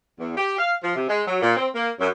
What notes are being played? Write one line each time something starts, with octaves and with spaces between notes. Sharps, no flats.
E2
G4
F5
F3
C3
G#3
F#3
A#2
C4
A#3
F#2